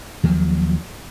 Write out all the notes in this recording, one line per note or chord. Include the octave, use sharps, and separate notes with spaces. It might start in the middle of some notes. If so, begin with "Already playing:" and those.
D#2 F3 F#3